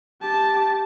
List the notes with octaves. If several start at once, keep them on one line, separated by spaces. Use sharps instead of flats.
G4 A5